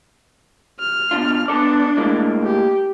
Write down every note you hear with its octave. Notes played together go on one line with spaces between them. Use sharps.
F6
B2 D4 F4
B3 D4 A4 D5
A2 G#3 A#3
G4